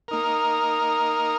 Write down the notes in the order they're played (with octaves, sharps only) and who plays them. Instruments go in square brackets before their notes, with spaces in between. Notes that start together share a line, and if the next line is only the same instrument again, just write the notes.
[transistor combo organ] A#3 D#4 A#4